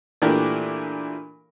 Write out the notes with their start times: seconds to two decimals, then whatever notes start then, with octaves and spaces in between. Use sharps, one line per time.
0.22 A#2 E3 A3 D4 G4 A#4